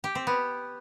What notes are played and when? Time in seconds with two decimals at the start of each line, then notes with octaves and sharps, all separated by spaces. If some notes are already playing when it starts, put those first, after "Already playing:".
0.04 G4
0.15 C4
0.27 B3